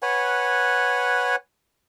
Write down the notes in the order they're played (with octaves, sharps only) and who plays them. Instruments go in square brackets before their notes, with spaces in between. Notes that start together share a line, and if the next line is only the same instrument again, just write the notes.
[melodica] B4 C#5 F#5 G#5